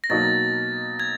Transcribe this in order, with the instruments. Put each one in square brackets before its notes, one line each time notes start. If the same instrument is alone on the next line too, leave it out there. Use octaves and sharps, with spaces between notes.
[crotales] A#6
[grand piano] B2 F#3 A#3 D#4 F#4 [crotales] A6
[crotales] G#6